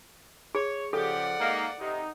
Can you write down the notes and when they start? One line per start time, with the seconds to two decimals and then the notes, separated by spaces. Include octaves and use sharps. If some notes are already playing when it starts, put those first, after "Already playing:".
0.55 G#4 C#5
0.93 C#3 F3 G4 A4 D5 F#5
1.40 G#3 A#3 D#4
1.80 C3 D#4